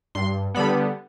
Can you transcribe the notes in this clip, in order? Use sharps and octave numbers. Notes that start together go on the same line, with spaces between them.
G2 C6
D3 G3 B3 B5